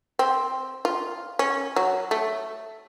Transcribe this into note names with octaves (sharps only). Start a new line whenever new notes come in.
C4
F4
C#4
F#3
A3